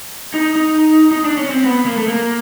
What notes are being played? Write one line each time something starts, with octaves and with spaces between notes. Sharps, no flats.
D#4
D#4
D#4
D4
C#4
C4
B3
A#3
A3
A#3